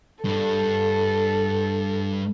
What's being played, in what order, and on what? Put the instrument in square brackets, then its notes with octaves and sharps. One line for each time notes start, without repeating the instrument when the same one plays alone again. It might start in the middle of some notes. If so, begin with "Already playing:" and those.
[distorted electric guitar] G2 [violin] A4